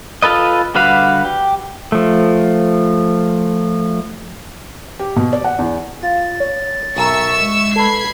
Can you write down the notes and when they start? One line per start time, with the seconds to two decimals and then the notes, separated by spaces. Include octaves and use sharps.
0.22 F4 A4 B4 D#5
0.75 D3 G3 F#4 B4 F5
1.25 G4
1.92 F3 A3
4.99 G4
5.16 B2
5.33 D5
5.44 F#5
5.59 E2
6.03 F4 A6
6.40 C#5
6.96 B1 A#4 E5 C#6 E6
7.40 G#3
7.76 A4 B4 B5 G#6 C7